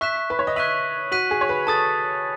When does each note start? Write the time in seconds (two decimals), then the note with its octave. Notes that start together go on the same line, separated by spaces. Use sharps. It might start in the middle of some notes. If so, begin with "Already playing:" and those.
0.01 E5 C#6 F#6 B6 E7
0.30 B4
0.39 C#5
0.47 D#5
0.56 E5 C#6 F#6 B6 D#7 F#7
1.12 F#4 F#6 B6 D#7 F#7
1.31 G#4
1.41 C#5
1.49 B4
1.67 A4 A5 D#6 A6